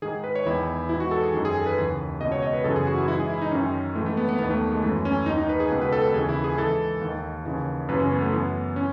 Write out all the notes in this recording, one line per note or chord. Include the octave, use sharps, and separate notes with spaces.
G#2 D#3 G#4
B4
C#5
E2 D#3 E4
G#2 E3 E4
F#4
A4
G#4
F#2 D#3
G#4
A4
B4
D#2 C#3 E3
C#2 B2 D#5
C#5
D#5
B4
F#2 C#3 E3 A4
G#4
F#4
E4
G#2 E3 E4
G#4
E4
D#4
F#2 D#3 C#4
G#2 E3 A3
A3
B3
B3
D#2 D#3 B3
A3
G#3
F#2 E3 A3
C#4
D#2 D#3 D#4
D#4
B4
G#4
C#2 B2
B4
A4
B4
D#2 C#3 E3 G#4
E4
G#4
G#2 E3 A4
D#2 D#3
D#2 C#3 E3
F#2 C#3 E3 B4
C#4
B3
A3
F#2 E3 B3
C#4